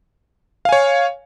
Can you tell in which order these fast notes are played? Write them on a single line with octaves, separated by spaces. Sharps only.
F5 G#5 C#5